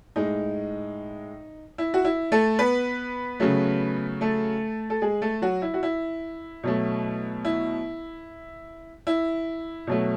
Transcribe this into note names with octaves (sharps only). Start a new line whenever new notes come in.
A2 G#3 D#4
E4
F#4
E4
A3 A4
B3 B4
C#3 F#3 A3
A3 A4
A4
G#3 G#4
A3 A4
F#3 F#4
E4
F#4
E4
B2 F#3 A3
E4
E4
B2 F#3 A3